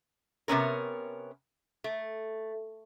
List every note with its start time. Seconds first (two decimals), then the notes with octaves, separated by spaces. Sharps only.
0.48 C3 B3 C#4 A#4
1.84 A3